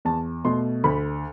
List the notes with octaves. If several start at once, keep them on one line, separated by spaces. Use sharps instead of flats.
E2 A5
B2 A3 C6
D2 B5